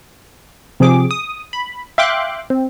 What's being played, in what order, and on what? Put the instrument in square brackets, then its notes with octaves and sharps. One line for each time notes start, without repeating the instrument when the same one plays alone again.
[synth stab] C3 F3 C4 G#4 D6
D#6
B5
E5 F5 G5 C6 D6 F#6
C4